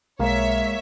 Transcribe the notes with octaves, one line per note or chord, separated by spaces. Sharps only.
B1 G#3 A#3 C#5 E5 F5